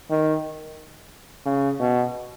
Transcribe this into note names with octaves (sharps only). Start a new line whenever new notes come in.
D#3
C#3
B2